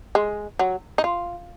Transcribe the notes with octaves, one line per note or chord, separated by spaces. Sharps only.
G#3
F#3
D#4
F4